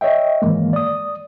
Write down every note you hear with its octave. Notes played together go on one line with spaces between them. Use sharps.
C#5 D#5 E5 G5
G#2 D#3 E3 G#3 A#3
D5 D#6